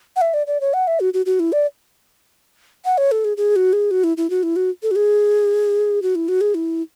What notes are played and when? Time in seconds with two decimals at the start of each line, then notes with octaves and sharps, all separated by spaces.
0.16 F#5
0.21 E5
0.34 D5
0.47 D5
0.61 C#5
0.74 F#5
0.87 E5
1.00 F#4
1.14 F#4
1.26 F#4
1.40 E4
1.52 D5
2.85 F#5
2.98 C#5
3.12 A4
3.25 G#4
3.37 G#4
3.56 F#4
3.73 G#4
3.91 F#4
4.04 E4
4.17 E4
4.30 F#4
4.43 E4
4.56 F#4
4.83 A4
4.91 F#4
4.96 G#4
6.02 F#4
6.15 E4
6.28 F#4
6.41 G#4
6.55 E4